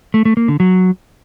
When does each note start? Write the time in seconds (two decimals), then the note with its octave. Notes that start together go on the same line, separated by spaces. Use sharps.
0.14 A3
0.25 A3
0.37 A#3
0.48 D3
0.60 F#3